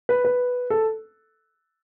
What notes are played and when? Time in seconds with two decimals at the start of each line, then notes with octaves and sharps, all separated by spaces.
0.09 B4
0.25 B4
0.70 A4